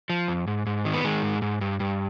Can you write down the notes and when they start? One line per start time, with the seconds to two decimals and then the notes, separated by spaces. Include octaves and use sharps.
0.10 F3
0.28 F2
0.47 G#2
0.66 G#2
0.85 D#3
0.93 B3
1.04 D#3 G#3
1.23 G#2
1.42 G#2
1.61 G2
1.80 G2